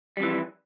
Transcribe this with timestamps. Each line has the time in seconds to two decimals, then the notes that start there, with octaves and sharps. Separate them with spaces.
0.17 G3
0.20 F2
0.23 E3